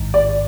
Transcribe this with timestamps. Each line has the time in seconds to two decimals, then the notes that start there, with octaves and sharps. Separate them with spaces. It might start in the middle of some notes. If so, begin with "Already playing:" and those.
Already playing: A1 G#2 D#3
0.14 D5